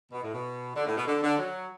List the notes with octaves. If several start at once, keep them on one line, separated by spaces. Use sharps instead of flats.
B2
A2
B2
D3
A2
B2
D3
D3
F#3